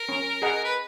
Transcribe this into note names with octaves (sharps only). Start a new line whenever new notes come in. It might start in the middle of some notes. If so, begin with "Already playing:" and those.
Already playing: A#4
C#4
G#4 D#5 F#5 A#5
B4